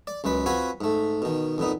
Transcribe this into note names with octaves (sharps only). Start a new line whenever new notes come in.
D5
C#2 F#2 G#3 B4
C4 F4 F#4 B4 F#5 G#5
G#2 A3
B2 D#3
F2 A#2 B3 D#4